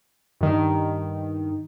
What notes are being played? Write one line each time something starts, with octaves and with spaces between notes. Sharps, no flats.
G2 D#3